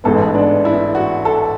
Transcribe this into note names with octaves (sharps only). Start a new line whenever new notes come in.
A1 G#2 G#3 B3 A4
D4
E4
F#4
A4